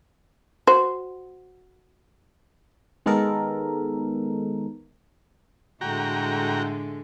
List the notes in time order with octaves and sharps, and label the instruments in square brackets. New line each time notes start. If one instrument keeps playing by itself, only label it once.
[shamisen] F#4 C5
[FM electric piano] D#3 G#3 B3 D#4 A4 A#4
[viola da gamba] A2 D3 G#3 [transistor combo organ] F#4 G5 A#5